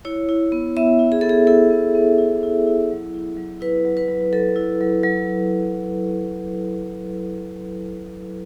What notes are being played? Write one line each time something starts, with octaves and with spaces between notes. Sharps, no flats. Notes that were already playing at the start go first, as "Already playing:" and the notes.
E4 C#5
E4
B3
B3 E5
E4
G#4
B3 A4
G#4
E4 A4
B3
B3
E4
E4
E4
F#3
E4
F#3
E4 B4
F#3
B4
F#3
F#3 A4
E4
F#3
F#3